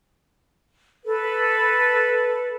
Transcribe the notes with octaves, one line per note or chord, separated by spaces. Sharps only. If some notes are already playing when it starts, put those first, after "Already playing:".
A4 B4